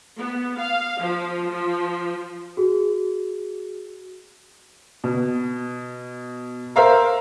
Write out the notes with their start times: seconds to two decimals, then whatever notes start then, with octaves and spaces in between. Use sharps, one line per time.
0.18 B3
0.58 F5
1.00 F3
1.49 F3
2.57 F#4 G#4
5.04 B2
6.76 A#4 C5 E5 F5 A#5